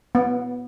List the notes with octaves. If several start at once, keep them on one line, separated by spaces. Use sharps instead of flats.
B3